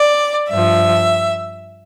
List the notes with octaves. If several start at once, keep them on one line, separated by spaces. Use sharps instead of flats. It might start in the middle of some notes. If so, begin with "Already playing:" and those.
Already playing: D5
G2 F3 E5